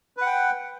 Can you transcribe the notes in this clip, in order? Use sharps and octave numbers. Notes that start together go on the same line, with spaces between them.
B4 F#5 G5